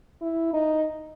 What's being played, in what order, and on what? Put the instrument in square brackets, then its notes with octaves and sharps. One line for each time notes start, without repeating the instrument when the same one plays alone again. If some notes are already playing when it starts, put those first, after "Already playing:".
[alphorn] E4
D#4